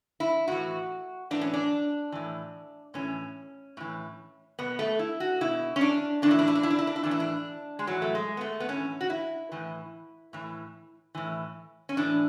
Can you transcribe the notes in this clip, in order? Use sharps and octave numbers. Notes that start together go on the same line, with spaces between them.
E4
A2 E3 F#4
A2 E3 D4
C#4
D4
A2 E3
A2 E3 C#4
A2 E3
B2 B3
A3
E4
F#4
B2 E4
C#4
D4
A2 E3 D4
E4
D4
E4
D4
E4
D4
E4
D4
E4
A2 E3 D4
E4
D4
G#3
A2 E3 F#3
A3
G#3
B3
A3
B3
A2 E3 C#4
F#4
E4
A2 E3
A2 E3
A2 E3
C#4
A2 E3 D4